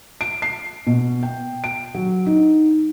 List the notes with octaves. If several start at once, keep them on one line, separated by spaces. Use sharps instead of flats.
D7
C7
B2
G5
D7
F#3
D#4